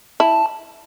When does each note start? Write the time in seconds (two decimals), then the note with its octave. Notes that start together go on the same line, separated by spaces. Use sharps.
0.20 E4 A5